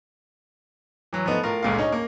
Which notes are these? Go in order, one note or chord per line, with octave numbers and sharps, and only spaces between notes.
E3 F#3
F3 A3 B3 D#4
A2 F4 A#4
G1 C#2 A#2 A3 F5
C#4 D#4
A#3